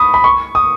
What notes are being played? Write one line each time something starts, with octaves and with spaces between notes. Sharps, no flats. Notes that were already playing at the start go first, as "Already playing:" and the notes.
Already playing: B5 C#6 D#6
B5
C#6
D#6